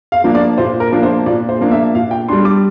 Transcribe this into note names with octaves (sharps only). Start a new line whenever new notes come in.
F5
F3 A#3 D4
D5
A#2 C5
A#4
F3 A#3 D4
C5
A#2 D5
C5
F3 A#3 D4
E5
A#2 F5
G5
G3 D4 C6
D6